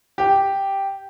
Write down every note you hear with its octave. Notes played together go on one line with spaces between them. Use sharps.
G4